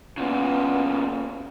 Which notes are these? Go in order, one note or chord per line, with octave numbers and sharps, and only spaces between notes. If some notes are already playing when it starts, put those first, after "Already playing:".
A#2 C#3 B3 F4